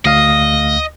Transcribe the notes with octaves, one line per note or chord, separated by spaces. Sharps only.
D2 D#5 F5 D#6